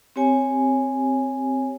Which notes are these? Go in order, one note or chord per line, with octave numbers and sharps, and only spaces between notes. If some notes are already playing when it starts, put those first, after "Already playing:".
C4 G4 C#5 G#5